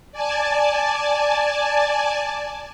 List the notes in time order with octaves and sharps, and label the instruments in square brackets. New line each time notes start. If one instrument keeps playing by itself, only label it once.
[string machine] D5 G#5 A5